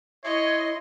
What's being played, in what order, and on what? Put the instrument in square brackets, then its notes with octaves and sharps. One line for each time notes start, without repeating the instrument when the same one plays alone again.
[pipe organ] E4 C6 [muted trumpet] C#5 [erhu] D#5